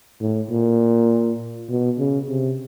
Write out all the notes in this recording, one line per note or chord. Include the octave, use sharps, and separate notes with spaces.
A2
A#2
B2
C#3
C3